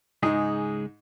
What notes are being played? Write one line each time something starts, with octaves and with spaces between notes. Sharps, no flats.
C#2 G#2 G#3 D#4 G#4